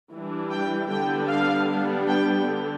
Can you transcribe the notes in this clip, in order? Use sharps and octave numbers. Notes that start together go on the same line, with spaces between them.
E3 G3 D4
G5
D3 G3 B3 D4 G5
F5
G3 B3 D4
G5
D3